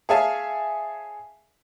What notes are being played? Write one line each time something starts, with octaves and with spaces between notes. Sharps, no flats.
G#4 C#5 E5 F5 G#5 A5